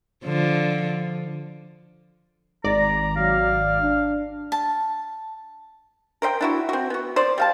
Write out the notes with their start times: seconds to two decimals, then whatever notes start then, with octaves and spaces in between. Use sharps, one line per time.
0.25 D3 F3
2.64 G#1 D5 A#5
3.16 F#3 F5
3.81 D4
4.52 A5
6.22 A#4 C5 D#5 G5
6.41 D4 E4 F#4
6.69 C4 F#4
6.90 B3 F#4
7.16 C5 D5
7.38 G3 F5 A5